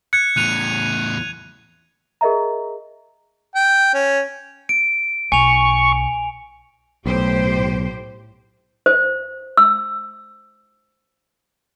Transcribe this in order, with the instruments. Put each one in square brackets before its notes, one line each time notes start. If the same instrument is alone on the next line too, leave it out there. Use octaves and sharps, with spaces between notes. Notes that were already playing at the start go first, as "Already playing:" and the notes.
[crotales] F#6 G#6 [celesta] C#7
[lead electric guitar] E2 A2 [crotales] F#6 D#7 F7
[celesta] G#4 A#4 D#5 E5 A#5
[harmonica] G5
C#4
[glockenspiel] D7
[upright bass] B1 [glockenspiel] G#5 F7 [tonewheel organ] C#6
[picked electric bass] B1 [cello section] A2 G4 C5
[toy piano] C5
E6